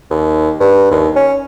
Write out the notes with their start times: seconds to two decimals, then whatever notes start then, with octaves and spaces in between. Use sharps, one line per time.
0.10 D#2
0.60 G2
0.91 D#2
1.16 C#4